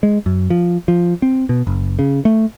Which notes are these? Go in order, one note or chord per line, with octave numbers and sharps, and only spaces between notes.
G#3
F#2
F3
F3
C4
B2
F#1
C#3
A3